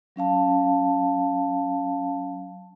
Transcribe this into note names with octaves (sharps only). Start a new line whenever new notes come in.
F#3 C#4 F5 A5